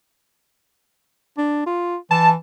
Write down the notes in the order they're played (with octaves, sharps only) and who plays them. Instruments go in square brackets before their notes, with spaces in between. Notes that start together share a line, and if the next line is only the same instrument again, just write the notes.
[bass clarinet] D4
F4
[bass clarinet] E3 [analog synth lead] A5